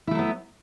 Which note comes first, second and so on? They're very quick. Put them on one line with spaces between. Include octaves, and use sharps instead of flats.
E4 A3 F#3 B3